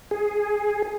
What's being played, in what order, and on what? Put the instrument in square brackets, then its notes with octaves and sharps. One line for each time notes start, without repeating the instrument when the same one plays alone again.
[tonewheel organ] G#4